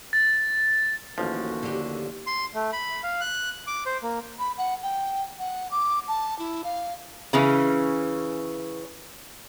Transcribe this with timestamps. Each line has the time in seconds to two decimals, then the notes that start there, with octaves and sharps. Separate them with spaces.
0.13 A6
1.18 A1 D#2 F3 F#4
1.63 D3 G4
2.27 C6
2.55 A3
2.73 B5
3.03 F5
3.21 F#6
3.67 D6
3.86 C5
4.03 A#3
4.39 B5
4.58 F#5
4.83 G5
5.39 F#5
5.71 D6
6.08 A5
6.39 E4
6.64 F5
7.33 C#3 E3 C#4